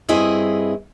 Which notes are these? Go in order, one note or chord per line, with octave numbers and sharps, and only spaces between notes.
G2 C4 E4 G#4 D#5